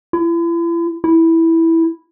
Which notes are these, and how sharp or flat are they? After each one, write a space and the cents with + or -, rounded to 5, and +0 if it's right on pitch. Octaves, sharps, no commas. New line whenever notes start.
E4 +40
E4 -5